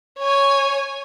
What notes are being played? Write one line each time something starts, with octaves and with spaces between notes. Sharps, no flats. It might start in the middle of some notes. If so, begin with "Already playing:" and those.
C#5 G#5